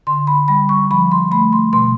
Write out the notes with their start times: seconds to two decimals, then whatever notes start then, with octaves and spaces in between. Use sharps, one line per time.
0.07 D3 C6
0.27 B5
0.48 G3 B5
0.69 C#6
0.91 F3 B5
1.12 C6
1.31 A3 B5
1.53 C6
1.73 B2 C6